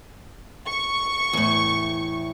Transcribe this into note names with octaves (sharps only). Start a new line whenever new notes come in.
C#6
E2 A2